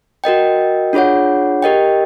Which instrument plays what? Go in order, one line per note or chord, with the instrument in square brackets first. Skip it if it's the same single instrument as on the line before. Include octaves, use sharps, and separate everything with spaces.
[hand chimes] F#4 A#4 D#5 G5
D4 F4 G#4 C#5 F#5
G4 A#4 D#5 G5